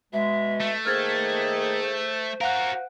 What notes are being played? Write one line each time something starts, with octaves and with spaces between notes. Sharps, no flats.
B2 G#3 E5
A3
D#3 A#3 G#4 C5 F6 G#6 A6
F#4 A#4 F5 F#5 F#6